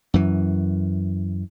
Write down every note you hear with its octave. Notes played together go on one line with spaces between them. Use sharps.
F#2 E3